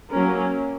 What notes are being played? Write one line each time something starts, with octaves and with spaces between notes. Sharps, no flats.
F#3 A#3 C#4 A#4